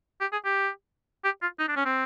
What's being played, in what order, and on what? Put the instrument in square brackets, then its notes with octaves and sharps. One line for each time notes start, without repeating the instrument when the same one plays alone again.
[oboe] G4
G#4
G4
G4
F4
D#4
D4
C#4
C4